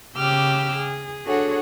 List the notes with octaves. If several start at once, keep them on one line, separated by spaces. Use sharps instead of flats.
C#3 G4 G5 D6 E6 F6
G#4
D4 F#4 G#4 A4 C#5 F#5